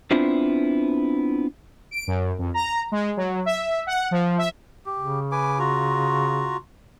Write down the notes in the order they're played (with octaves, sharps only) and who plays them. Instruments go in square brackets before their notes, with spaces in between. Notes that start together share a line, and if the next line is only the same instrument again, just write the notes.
[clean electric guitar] B3 C4 D4 E4 F4 C5
[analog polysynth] D7
F#2
F2
A#5
G#3
F#3
E5
F#5
F3
E5
[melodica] G4
[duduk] C#3
[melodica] B4 G#5 D6
F4 F#4 A#5